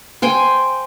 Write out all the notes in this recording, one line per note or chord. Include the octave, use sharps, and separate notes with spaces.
C5 G5 G#5